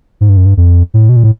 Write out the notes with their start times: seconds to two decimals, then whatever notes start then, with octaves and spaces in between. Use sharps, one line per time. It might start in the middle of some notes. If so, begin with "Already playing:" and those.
0.21 G#2
0.29 G2
0.37 F#2
0.46 G2
0.57 F2
0.94 A2
1.09 B2
1.16 A#2
1.24 A2